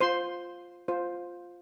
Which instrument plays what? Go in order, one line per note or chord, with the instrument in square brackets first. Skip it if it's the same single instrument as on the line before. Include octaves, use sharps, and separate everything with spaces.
[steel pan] F4 C5 C6
F4 C5